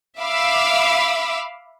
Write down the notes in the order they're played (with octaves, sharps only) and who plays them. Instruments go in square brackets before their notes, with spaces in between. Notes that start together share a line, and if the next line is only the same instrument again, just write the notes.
[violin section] E5 F5 B5 D6 E6